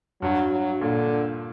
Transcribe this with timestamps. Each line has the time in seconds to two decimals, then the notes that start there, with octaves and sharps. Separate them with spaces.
0.22 G2 F#3
0.51 F#3
0.81 A#2 D3